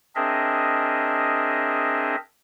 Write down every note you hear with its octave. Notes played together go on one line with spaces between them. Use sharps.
C4 D4 G#4 A#4 D#5 E5